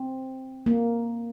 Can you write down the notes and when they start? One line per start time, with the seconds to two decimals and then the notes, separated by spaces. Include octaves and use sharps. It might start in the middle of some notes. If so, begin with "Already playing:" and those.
Already playing: C4
0.66 A#3